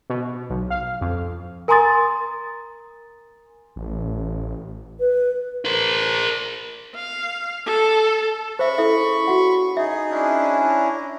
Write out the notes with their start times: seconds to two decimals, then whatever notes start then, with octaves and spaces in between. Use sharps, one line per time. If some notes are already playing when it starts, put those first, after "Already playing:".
0.10 B2
0.50 B1
0.70 F5
1.01 F2
1.68 A#4 G#5 A#5 C6 D#6 A6
3.76 A1
5.00 B4
5.65 A#4 C5
6.95 F5
7.66 A4
8.59 C#3 C5 E5 B5 C#6
8.78 E4 A4 E5
9.28 F#4 F#5
9.77 D#4 G#4 E5
10.10 C#4 D4 E4
10.69 A#5